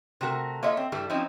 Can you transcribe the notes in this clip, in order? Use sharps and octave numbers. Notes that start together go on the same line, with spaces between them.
C3 A3 F#4 A#4
A#3 F4 C#5 D#5 E5
C4
G2 E3 G3 A3
F3 C4 C#4 D#4 E4